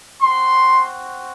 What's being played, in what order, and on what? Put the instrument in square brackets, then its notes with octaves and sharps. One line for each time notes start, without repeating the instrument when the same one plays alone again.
[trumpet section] C4 F#4 C6